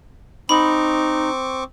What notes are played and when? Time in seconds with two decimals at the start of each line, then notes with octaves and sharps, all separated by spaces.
0.49 C4 D#4 B5 C#6 D6